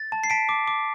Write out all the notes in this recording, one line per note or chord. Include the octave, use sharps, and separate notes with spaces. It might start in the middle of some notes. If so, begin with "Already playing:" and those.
Already playing: A6
A5
C7
A5 B6 D7
D6
D6